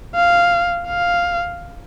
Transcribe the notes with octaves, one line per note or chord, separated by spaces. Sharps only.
F5
F5